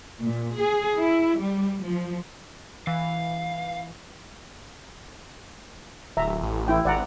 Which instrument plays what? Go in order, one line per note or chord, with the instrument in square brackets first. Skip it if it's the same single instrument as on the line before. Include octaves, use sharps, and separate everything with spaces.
[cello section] A#2
G#4
E4
G3
F3
[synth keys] E3 [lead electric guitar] F5
[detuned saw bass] D1 [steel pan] E5 A#5
[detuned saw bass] A1
[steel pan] E4 G5
[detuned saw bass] G#1 [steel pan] D5 F#5 A#5